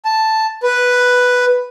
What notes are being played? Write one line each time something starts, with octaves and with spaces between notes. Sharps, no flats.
A5
B4